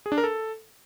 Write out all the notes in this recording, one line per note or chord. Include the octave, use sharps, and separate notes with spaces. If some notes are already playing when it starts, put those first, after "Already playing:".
G#4
D4
A#4
A4